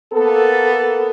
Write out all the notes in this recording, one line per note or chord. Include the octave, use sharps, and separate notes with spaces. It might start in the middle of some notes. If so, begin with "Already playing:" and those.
A#3 B3 A4